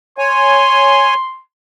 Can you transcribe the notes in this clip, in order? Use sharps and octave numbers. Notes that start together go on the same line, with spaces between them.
C#5 G#5 C6